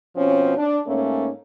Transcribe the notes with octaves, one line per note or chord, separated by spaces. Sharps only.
B2 F3 C4 C#4
D4
G#2 A3 A#3 C#4